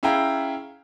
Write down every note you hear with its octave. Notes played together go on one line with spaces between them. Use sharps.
C#4 E4 G#4 F5 G5 A#5